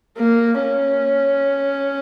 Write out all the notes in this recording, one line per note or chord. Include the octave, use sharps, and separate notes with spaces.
A#3
C#4